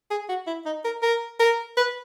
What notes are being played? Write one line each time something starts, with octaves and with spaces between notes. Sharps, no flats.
G#4
F#4
E4
D#4
A#4
A#4
A#4
B4